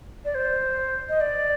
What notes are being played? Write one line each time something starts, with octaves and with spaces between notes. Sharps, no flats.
D5
C5
D#5
D5